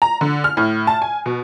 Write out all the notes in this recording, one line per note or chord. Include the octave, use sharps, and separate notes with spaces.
A#5
D3
F6
A2
A5
G#5
B2